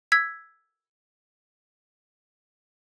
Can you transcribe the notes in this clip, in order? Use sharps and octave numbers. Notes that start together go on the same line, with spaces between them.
E6 G#6 B6